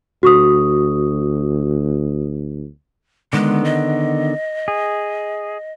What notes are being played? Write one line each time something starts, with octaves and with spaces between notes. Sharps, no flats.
D2 F#4 C#6 D#6
D3 D#3 G#3 B3
D#5
G#4